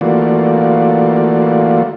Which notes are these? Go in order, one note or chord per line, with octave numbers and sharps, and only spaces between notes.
E3 A3 A#3 F4 F#4 D5